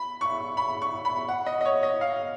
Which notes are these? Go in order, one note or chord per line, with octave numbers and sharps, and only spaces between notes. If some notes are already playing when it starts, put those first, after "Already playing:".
Already playing: B5
C#6
B5
C#6
B5
F#5
D#5
D#5
C#5
D#5
F5